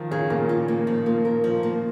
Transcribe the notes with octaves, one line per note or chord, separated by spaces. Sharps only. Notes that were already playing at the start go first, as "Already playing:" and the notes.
Already playing: D#3 F3
C#3 G#4
A#2 A#3
F4
A#3
F3
A#3
A#4
F3
A#3